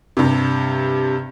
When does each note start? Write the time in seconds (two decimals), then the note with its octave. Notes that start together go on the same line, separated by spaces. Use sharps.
0.17 G2 C3